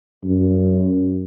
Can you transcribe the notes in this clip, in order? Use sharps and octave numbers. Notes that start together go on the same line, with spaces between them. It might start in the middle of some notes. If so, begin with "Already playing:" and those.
F#2